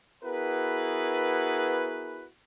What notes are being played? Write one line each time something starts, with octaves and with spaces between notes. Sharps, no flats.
B3 E4 F#4 G#4 A#4 B4